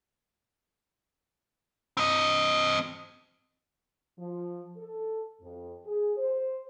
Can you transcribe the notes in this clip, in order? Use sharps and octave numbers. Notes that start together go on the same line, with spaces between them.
C4 D#5
F3
A4
F2
G#4
C5